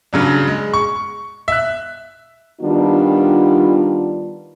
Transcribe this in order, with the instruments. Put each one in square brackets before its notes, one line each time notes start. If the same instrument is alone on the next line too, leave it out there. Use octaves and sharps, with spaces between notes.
[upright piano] G2 C#3 F#3 D4
G#3
C#6
E5 F#6
[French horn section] D#3 G3 B3 D4 F4